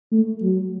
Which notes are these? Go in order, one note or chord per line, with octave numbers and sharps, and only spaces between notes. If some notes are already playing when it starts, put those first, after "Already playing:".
A3
F#3